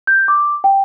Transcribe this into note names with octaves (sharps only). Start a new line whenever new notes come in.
G6
D6
G5